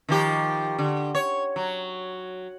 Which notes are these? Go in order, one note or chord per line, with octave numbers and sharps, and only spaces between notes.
D#3 F3 G4
D3
C#5
F#3